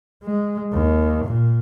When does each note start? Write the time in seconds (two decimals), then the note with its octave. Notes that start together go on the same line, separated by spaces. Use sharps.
0.24 G#3
0.73 D#2
1.26 A#2